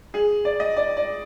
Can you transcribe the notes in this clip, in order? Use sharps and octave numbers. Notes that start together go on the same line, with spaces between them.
G#4
D5
D#5
D5
D5